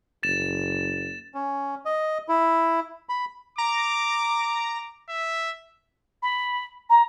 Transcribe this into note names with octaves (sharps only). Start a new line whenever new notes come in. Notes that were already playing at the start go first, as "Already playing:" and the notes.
F#1 A6 E7
C#4
D#5
E4
B5
A#5 D6
E5
B5
A#5